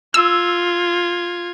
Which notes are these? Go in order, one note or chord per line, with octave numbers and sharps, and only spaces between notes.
F4 E6 G#6